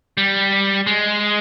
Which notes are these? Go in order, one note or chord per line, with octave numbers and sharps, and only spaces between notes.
G3
G#3